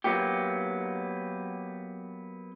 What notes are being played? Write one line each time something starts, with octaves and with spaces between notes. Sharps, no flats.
F#3 A#3 B3 G4